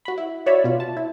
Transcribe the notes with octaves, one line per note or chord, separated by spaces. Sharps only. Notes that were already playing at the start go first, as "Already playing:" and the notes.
F#4 B5
E4
F#4 C#5 D5 E5 B5
B2 F4
A5
E4